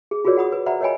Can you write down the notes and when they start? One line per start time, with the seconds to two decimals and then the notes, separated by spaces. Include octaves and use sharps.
0.11 G#4
0.25 F4 F#4 G#4 A#4 C#5 D5
0.36 G#4 F#5 B5 D#6
0.52 B4
0.66 C5 D5 E5 F#5 A#5 B5
0.81 A#4 C#5 D#5 G5 G#5 B5